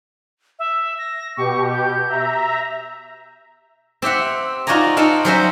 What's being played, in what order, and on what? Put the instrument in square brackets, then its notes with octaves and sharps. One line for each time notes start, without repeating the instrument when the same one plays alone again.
[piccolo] E5
A#6
[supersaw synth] B2 G4 [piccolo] C#6
[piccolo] G6
[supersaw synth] E5 A#5
[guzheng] C4 G4 E5 F#5
D#4 F4 F#4 D5 G#5 A#5
C4 D#4 F5 F#5 A5
F#3 G3 C#4 C5 D#5 E5